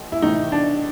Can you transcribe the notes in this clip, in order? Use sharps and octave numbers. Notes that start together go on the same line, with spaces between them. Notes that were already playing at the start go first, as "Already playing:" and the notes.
Already playing: A1 A2 E3
E4
A1 A2 E3 D#4
D4